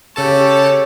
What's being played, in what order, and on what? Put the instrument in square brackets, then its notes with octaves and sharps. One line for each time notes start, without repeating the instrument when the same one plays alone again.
[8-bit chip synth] C#3 A4 A5 [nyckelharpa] G4 C#5